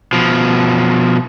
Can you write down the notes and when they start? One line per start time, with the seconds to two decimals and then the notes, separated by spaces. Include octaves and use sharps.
0.13 B2 F3